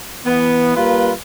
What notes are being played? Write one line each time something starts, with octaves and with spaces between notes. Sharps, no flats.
E3 B3
G3 A#3 F4 B4